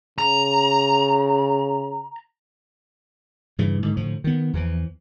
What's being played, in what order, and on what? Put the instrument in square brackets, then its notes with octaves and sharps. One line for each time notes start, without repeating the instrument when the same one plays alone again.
[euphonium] C#3 [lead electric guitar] A#5
[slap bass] G2 C#3 E3
G#2 D3 D#3
A2 D3 F3
D#3 B3
E2 E3 F3